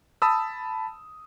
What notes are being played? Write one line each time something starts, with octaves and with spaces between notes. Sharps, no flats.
A5 B5 D#6 E6